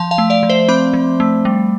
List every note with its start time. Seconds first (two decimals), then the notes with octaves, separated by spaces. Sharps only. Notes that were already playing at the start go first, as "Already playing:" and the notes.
Already playing: F3 F5 A5
0.11 F5 A5
0.18 A3
0.30 D5 F5
0.43 F3
0.50 C5 E5
0.68 C4 B5 D6
0.94 F3
1.20 A3
1.45 G3